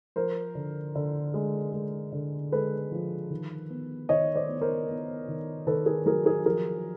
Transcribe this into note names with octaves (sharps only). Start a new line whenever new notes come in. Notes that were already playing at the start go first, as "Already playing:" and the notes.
F3 A#4 C5
D3
D3
G#3
G#3
D3
G#3 A4 B4
F3
D#3
B3
D#3 C#5 D#5
C5 D5
B3
A#4 C5
B3
D#3
D#3 A4 B4
G#4 A#4
F#3 G#4 A#4
G#4 A#4
F3 G#4 A#4